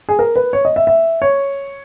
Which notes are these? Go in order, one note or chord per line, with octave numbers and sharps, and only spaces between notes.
G#4
A#4
B4
C#5
D#5
E5
E5
C#5